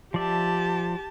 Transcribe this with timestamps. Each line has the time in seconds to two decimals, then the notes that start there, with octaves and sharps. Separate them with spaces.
0.14 F3 G4 D5 E5 A5